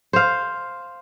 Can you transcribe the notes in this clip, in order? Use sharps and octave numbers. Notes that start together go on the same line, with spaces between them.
C5 F5